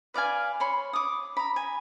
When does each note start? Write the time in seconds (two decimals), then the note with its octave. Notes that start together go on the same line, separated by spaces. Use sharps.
0.14 B4 D5 F5 G#5
0.60 C#5 B5 C6
0.93 D6 D#6
1.37 A#5 B5
1.56 G#5